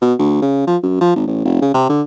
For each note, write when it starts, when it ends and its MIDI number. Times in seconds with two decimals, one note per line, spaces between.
0.01 0.14 47
0.19 0.41 38
0.42 0.64 49
0.67 0.77 53
0.83 0.99 42
1.01 1.13 53
1.15 1.26 32
1.27 1.42 33
1.45 1.62 29
1.62 1.70 49
1.74 1.84 48
1.89 2.02 50